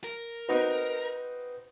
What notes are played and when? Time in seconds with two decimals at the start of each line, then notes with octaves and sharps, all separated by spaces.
0.04 A#4
0.49 C4 D#4 F#4 B4